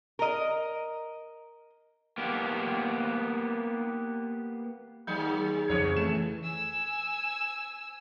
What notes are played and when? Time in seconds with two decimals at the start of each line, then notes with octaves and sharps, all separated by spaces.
0.19 A#4 D#5
2.18 A#3 B3 G4
5.07 D#2 F#3 G#4 G6
5.69 C2 F2 C#3 C#5
5.97 E3 A3 E7
6.44 G#5 E6